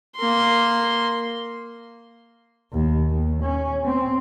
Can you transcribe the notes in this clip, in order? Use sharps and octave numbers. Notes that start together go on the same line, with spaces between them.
A#3 C6
D#2
D#2
C#4
C4